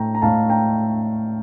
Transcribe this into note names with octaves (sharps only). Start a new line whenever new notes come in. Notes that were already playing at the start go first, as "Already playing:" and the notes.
Already playing: A2 A3 G5 A#5
A#5
A2 A3 F5 A5
G5 A#5